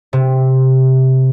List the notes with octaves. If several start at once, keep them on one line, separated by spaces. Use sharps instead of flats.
C3